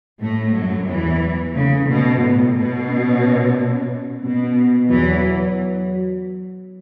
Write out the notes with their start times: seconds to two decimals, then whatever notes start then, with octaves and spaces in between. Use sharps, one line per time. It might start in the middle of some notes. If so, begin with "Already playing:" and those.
0.21 A2 A3
0.54 F#2 F#3
0.88 E2 E3
1.55 C#3 A3
1.88 B2 B3
2.22 A2
2.55 B2
2.89 C#4
4.23 B2 B3
4.90 E2 E3 F#3